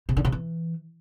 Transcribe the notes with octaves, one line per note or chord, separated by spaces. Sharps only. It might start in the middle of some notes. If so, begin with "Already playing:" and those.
C3
D3
C3
E3